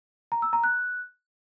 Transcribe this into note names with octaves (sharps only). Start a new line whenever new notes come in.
A#5
E6
A#5
F#6